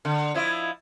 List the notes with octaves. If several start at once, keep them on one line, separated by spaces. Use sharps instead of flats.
D3
F3 E4 D#5